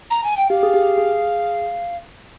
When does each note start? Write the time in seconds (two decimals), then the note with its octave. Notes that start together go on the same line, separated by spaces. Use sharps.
0.10 A#5
0.24 G#5
0.37 G5
0.49 G4 F5
0.63 G#4
0.74 G4
0.98 G#4